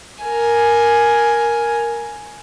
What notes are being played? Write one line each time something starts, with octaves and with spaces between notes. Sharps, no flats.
A#4 G#5